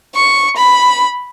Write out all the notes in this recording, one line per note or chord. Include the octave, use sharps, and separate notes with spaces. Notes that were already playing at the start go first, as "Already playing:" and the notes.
C#6
B5